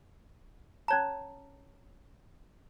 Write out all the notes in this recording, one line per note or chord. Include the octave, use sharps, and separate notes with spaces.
C#4 C#5 A5 A#5 G#6